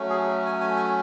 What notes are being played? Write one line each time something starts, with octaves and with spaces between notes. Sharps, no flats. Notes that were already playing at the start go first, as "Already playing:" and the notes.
Already playing: F#3 A3 C#4
G#4
G#5
G#5
G#5